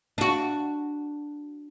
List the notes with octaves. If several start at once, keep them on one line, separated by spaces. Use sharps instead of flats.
D4 F#4